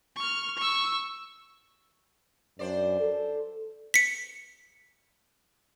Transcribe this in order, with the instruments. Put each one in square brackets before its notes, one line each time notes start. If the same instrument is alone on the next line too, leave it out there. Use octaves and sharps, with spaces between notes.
[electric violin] C#6 F6
C#6 E6
[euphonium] F#2 [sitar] D4 C5 D5
[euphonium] A4
[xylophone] B6 C#7